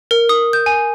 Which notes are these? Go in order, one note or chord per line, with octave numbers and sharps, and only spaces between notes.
A#4
D#6
G6
G#5